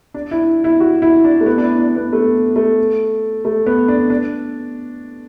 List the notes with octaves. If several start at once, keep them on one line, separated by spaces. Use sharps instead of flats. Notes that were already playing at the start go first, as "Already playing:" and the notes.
D4
E4
E4
F#4
E4
D4
A3
B3
D4
E4
D4
B3
A3
A3
A3
B3
D4
D4